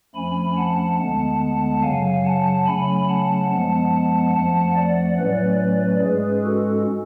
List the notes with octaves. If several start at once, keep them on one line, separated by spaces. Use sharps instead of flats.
F2 F3 A3 C#4 G#5 B5
F#5 A5
D2 D3 G#3 B3 F#5 A5
F#2 C#3 F#3 F5 G#5
F#5 A5
C#3 F#3 A3 C#4 G#5 B5
F#5 A5
F#2 F3 G#3 B3 F#5 A5
F2 F3 A3 F#5 A5
D5 F#5
A2 F#3 A3 C#4 B4 D5
G#2 G#3 C#4 G#4 B4
F#4 A4